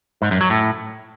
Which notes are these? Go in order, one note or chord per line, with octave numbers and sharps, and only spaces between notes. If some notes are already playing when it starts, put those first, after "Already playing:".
G#2
F#2
F#3
A2